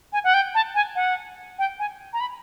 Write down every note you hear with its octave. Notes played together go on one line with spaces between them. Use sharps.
G#5
F#5
G5
A5
G#5
F#5
G5
G#5
A#5
B5